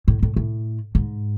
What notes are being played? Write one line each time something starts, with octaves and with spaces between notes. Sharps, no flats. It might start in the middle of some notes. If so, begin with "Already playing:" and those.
A2
A2
A2
G#2